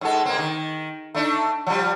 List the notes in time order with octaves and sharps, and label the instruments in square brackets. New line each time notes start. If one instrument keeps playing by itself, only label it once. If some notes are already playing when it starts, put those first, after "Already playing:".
[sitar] G#2 G#3 A4
G#3 A#3 C4
D#3
A3 D4 D#4
F3 G3